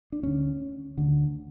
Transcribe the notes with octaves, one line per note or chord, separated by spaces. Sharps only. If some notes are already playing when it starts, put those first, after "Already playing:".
D4
D2 D3 C#4
D2 D3